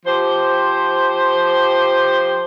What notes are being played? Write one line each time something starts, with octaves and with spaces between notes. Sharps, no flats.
F3 G4 C5